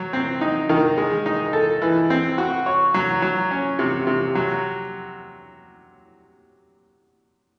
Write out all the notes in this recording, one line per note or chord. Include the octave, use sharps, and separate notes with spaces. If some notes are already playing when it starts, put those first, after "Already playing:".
Already playing: F#3
C4
D#4
D#3
G#3
D#4
A4
E3
C4
F#4
C#5
F#3
F#3
C#4
C3
C3
F#3